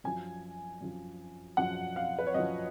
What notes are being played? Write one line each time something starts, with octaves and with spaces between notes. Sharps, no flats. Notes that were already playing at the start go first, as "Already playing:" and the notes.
F#2 F3 G#5
F#2 F3
F#2 F3 F#5
F5
B4
C#5
F#2 F3 D#5